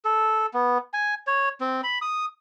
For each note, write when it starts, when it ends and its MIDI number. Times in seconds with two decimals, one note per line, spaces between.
0.05 0.46 69
0.54 0.78 59
0.94 1.15 80
1.27 1.49 73
1.61 1.81 60
1.83 1.99 83
2.02 2.25 87